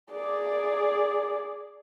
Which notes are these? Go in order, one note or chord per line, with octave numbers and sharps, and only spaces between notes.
G#4 D5